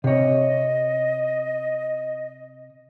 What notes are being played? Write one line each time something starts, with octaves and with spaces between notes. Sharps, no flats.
C3 C#5 D#5